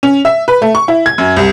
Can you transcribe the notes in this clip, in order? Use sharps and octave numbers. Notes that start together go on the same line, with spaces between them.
C#4
E5
B4
A3
C#6
E4
G#6
F#2
C2